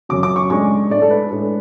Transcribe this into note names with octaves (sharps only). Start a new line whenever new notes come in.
F#2 C#3 F#3 D6
D6
C#6
A2 G#3 D4 C#6
A2 G#3 D4 D5
A4
B4
A2 G#3 D4